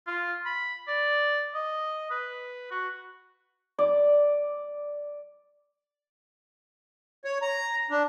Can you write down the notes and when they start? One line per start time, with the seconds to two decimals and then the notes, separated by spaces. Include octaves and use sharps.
0.07 F4
0.46 B5
0.88 D5
1.54 D#5
2.11 B4
2.71 F#4
3.79 D5
7.25 C#5
7.42 A#5
7.91 D4